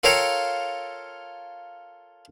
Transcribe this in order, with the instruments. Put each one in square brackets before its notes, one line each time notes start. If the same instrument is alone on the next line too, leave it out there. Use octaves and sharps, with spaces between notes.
[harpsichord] F4 A4 A#4 C#5 F5 G5